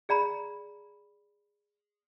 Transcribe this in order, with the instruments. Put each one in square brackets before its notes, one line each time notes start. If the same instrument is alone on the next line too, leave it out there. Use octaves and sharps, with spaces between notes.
[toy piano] G#4 D5 A#5 B5